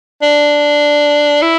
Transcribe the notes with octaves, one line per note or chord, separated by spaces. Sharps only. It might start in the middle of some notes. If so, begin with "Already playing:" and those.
D4
E4